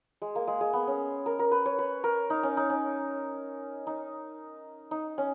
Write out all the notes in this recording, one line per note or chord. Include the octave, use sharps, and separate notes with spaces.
G#3
A#3
G#3
G#3
B3
C#4
A#4
A#4
B4
C#5
B4
A#4
D#4
C#4
D#4
C#4
D#4
D#4
C#4